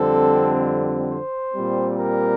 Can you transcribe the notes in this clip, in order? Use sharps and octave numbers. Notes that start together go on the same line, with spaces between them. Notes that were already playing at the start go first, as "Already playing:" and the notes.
Already playing: F2 D3 G3 C4 A4
C5
A#2 G3 C4
A#4